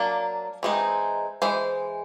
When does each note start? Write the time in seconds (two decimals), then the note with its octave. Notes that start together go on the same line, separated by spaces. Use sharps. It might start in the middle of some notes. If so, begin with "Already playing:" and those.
Already playing: F#3 A#3 D4
0.63 E3 G#3 C4 D#4
1.42 E3 G#3 C5